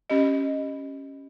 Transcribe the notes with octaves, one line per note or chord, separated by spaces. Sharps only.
C#4 G4 D#5